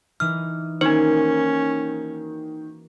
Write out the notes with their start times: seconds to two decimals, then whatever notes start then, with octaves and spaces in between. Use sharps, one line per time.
0.20 E3 D#4 F6
0.81 D#3 A#3 C#4 D#4 F#4 C5 D7